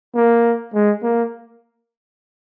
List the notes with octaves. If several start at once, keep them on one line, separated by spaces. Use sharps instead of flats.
A#3
G#3
A#3